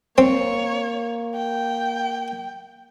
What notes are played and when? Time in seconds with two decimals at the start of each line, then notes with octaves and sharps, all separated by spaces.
0.18 A#3 C4 C#5
1.35 G5